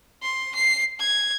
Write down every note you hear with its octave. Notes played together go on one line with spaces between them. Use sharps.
C6
C7
G#6